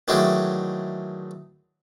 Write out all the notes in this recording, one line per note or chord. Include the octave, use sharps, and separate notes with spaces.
D#3 E3 F#3 G#3 A3 D4